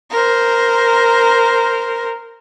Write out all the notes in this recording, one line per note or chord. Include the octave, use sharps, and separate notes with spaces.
A#4 C5